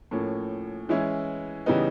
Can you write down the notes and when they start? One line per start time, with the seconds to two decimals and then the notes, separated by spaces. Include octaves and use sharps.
0.11 A2 F3 A#3 C#4
0.89 E3 G#3 C#4 E4
1.66 C#3 E3 G3 B3 D#4